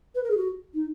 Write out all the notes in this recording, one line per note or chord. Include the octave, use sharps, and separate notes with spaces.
B4
A#4
G#4
F#4
D#4